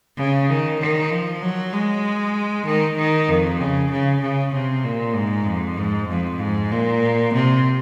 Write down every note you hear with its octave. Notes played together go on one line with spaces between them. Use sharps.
C#3
D#3
D#3
F3
F#3
G#3
D#3
D#3
F2
C#3
C#3
C#3
C3
A#2
G#2
F2
G#2
F2
G#2
A#2
C3